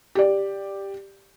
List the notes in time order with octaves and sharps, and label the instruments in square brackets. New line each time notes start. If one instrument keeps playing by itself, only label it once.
[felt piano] G4 D5